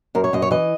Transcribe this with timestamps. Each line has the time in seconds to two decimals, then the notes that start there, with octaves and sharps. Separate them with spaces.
0.15 F#2 A#4
0.24 C#5
0.33 F#2 D#5
0.42 C#5
0.51 E3 D#5